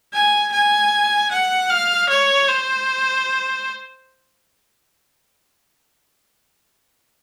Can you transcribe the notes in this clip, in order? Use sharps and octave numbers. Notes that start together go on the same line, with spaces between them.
G#5
G#5
F#5
F5
C#5
C5